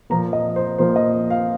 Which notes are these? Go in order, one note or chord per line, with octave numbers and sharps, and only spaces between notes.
A#2 F3 A#3 A#5
D#5
C5
A#2 F3 A#3 C5
D#5
F5